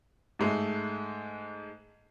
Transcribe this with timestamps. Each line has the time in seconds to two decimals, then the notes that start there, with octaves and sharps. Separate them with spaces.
0.39 G#2 G#3 A3